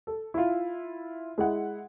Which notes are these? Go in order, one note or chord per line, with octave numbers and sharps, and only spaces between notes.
A4
E4 F4
G#3 E4 F#5